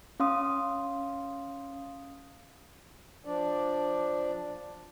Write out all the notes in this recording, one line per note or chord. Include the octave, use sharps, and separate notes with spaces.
C#4 F5 C6 D#6
F3 D4 D5